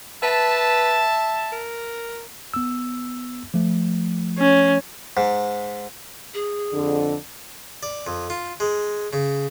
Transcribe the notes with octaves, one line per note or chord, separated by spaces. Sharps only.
B4 E5 A5
A#4
B3 E6
F3 A3
C#4
G#2
G#4
F2 D3
D5
F2
F4
G#3
C#3